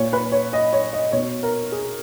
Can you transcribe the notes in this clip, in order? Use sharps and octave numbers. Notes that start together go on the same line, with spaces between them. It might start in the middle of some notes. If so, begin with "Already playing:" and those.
Already playing: A#2 C#5
B4
C#5
D#5
C#5
D#5
B2 C#5
A#4
G#4